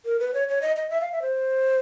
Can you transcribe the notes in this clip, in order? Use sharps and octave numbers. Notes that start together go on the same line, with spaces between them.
A#4
B4
C#5
C#5
D#5
D#5
E5
F5
E5
C5